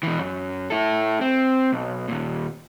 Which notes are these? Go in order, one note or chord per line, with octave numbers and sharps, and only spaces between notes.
B2 E3
F#2
E4 A4
C4
B1
D#2 A#2